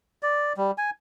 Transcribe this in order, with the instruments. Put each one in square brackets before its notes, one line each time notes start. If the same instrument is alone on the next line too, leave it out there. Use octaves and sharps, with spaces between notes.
[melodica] D5
G3
G#5